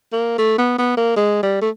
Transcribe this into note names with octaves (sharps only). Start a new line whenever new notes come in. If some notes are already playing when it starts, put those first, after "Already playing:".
A#3
A3
B3
B3
A#3
G#3
G3
A3